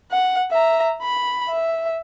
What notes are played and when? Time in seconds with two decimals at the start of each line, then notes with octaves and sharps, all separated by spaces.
0.11 F#5
0.51 E5 A#5
1.03 B5
1.49 E5